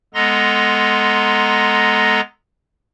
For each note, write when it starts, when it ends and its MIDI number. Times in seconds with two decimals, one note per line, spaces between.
0.14 2.21 56
0.14 2.21 59
0.14 2.21 69
0.14 2.21 82
0.14 2.21 84
0.14 2.21 94